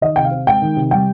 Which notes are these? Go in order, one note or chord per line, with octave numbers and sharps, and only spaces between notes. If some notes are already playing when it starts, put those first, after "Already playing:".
D#3 D#5
C3 G5
F5
C4
G#3 G5
D#3
C3
G3 G5